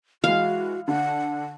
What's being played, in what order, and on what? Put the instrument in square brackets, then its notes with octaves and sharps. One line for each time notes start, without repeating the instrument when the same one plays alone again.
[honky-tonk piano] E3 G#3 [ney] F#4 [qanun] F5
[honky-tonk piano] D3 D4 [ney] F#5